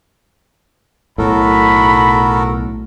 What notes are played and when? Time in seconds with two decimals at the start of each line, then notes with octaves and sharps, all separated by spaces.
1.18 B1 A2 F#4 A4 A#4 B5